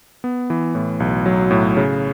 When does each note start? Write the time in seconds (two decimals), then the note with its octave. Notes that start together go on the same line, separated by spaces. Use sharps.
0.24 B3
0.50 E3
0.75 A2
1.00 B1
1.26 F#3
1.51 A2
1.77 C#3